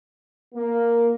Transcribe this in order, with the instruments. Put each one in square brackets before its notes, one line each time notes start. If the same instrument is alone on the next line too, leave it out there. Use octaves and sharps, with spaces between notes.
[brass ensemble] A#3